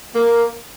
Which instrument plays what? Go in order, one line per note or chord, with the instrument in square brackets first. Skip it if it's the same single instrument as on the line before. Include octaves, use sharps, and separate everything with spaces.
[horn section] A#3